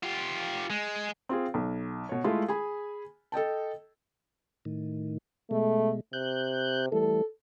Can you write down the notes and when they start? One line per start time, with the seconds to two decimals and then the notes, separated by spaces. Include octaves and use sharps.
0.03 F4 G4
0.70 G#3
1.29 C4 F4 G#4
1.54 B1
2.09 B2 C#5
2.24 G#3 A3 E4 F4
2.48 G#4 G#5 B5
3.32 A4 D#5 G5 A5
4.65 A2 D#3
5.51 B2 G#3 A3
6.13 C3 F#6 G6
6.92 E3 G3 A3 A4